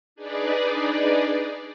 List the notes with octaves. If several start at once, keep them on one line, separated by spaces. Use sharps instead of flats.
D4 D#4 G#4 B4 D5